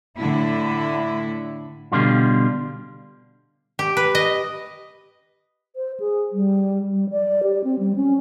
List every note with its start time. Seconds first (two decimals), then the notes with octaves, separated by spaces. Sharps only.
0.17 A2 D3 E4
1.92 B2 D3 G3 F4
3.79 G4
3.97 B4
4.15 D#5
5.76 C5
6.00 G#4
6.32 G3
6.90 G3
7.10 D5
7.43 G4
7.64 C4
7.79 G3
7.96 C#4